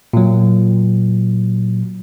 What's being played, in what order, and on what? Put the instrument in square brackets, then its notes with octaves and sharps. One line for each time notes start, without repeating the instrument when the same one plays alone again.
[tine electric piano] A#2 F#3